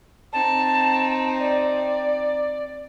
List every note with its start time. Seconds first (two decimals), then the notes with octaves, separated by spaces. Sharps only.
0.33 C4 D#4 A5
1.40 D5